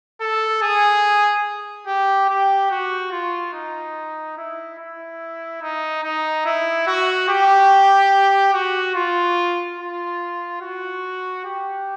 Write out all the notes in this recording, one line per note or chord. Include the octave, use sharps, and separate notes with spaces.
A4
G#4
G4
G4
F#4
F4
D#4
E4
E4
D#4
D#4
E4
F#4
G4
F#4
F4
F4
F#4
G4